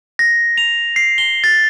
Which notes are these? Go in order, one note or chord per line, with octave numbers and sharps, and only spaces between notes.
A#6
F7
C7
G7
A6